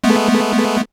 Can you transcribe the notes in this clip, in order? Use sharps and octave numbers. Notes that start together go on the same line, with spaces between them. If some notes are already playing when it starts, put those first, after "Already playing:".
G#3 A3 B3